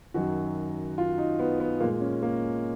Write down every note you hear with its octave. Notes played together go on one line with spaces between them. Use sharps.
F#2 D#3 F#3 F#4
F4
D#4
B3
B3
A#2 G#3 A#3
C#4
A#3